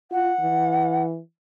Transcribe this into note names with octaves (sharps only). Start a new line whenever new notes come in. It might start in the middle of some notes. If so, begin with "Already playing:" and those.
F4 F#5
E3